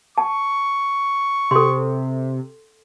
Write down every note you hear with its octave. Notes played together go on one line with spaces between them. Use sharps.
A5 C#6
C3 A4 C6